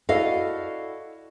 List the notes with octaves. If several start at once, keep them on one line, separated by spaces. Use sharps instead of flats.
E4 F#4 A4 D5 D#5 F5